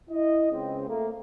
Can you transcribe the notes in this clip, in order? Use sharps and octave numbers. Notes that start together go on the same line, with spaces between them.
E4 D#5
C#2 C#3 C4
A3 A#3